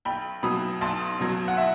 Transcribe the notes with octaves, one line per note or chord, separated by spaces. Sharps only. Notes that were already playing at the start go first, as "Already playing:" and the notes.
B1 G5 B5
B2 F#3 B5 D#6
B1 A5 C6
B2 F#3
F#5
E5